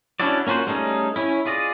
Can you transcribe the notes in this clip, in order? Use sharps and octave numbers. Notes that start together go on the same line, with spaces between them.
C#4 D4 E4 F#4 D5
A#3 C#4 F4 F#4 C5
G3 A3 C#4 D#4 G#4
C#4 E4
F4 G#4 D5 D#5